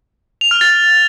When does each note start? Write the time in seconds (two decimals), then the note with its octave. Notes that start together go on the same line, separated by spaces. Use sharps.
0.41 F7
0.51 F6
0.61 A6